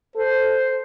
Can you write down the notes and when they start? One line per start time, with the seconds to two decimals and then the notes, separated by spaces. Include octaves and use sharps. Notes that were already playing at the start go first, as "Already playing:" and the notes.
0.16 A4 C5